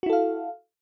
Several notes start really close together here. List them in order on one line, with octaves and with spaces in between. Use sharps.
F#4 E4 A4 F5